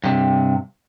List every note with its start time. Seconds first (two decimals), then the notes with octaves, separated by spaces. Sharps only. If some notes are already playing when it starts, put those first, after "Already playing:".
0.04 G2 C3